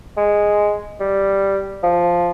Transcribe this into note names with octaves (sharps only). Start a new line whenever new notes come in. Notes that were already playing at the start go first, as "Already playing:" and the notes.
G#3
G3
F3